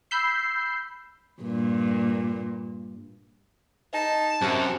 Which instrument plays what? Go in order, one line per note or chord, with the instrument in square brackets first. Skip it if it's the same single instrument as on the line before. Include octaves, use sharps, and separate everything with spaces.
[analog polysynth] B5 E6 G6 C7
[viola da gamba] G2 A#2
[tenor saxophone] D#4 [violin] A5
[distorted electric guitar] F#2 [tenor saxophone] C3